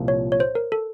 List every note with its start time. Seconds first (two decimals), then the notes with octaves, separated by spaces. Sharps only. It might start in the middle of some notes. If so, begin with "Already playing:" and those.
Already playing: C2 A#2 F3
0.08 C#5
0.32 C#5
0.40 C5
0.55 A#4
0.72 A4